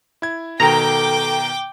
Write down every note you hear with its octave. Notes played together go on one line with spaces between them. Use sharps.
E4 G#6
B2 D#3 A4 G5 A#5 D6